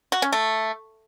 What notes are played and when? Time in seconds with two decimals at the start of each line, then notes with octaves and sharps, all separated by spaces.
0.12 F#4
0.22 C#4
0.32 A3